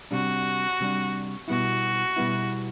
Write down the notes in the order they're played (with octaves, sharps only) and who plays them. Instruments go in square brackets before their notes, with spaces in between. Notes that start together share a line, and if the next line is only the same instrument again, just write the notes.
[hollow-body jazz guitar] C3 G3 D4 [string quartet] F#4
[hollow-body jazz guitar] C3 G3 D4
[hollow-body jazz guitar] B2 G3 B3 E4 [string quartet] F#4
[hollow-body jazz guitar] B2 G3 B3 E4